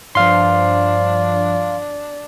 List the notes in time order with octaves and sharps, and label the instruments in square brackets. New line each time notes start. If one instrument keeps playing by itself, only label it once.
[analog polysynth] G2 F3 [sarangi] D4 [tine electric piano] F5 C6